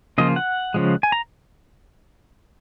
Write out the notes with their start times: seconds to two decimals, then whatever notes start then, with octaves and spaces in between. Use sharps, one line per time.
0.18 C#3 F3 A#3 F4 D#5
0.36 F#5
0.74 C#3 F3 G#3
1.03 G#5
1.12 A#5